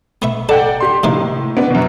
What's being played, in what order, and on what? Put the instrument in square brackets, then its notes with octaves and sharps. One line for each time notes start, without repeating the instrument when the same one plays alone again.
[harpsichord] B3 E5 C#6
[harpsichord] A4 [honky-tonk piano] D5 F#5 G5
[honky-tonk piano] G4 C6
[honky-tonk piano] A2 [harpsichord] C3 D#3 A#3
[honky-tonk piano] B3 D4
F#2 B2